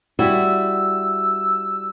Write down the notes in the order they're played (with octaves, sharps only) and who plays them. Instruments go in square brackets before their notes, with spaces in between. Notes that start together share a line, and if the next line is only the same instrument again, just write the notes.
[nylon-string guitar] G3 E4 F#4 [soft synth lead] E6